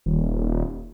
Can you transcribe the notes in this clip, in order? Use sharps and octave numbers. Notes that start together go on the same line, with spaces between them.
D#1